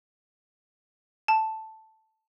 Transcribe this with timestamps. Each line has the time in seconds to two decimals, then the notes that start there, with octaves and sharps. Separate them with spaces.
1.28 A5